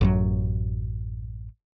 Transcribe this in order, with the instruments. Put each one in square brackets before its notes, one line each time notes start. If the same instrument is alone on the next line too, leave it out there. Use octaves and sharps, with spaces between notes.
[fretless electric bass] A1 F#2 F#3